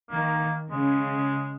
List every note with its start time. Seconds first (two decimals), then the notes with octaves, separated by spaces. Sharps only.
0.10 D#3 A#3
0.71 C#3 G#3